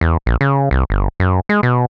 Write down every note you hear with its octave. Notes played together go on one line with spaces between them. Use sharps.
E2
A#1
C#3
C2
G1
F#2
G#3
B2